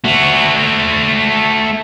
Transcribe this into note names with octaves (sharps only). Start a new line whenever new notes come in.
A3 F#4